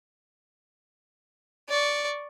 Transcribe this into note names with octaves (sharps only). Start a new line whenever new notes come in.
D5 C#6